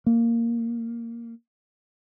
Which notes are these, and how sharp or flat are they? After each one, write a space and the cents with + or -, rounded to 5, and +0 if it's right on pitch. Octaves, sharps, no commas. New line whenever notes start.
A#3 -5